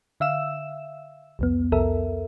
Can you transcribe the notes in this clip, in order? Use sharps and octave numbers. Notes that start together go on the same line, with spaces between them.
D3 E5 F5 E6 E7
C2 F2 B3
C2 F2 A4 A#4 E5